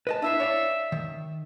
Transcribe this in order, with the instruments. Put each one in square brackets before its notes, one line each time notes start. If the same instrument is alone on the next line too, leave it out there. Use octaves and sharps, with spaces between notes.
[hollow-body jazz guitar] B4 D#5 A5
[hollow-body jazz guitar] D4 E4 F5 [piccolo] E5
[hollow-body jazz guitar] C#5 D5 F5
D#3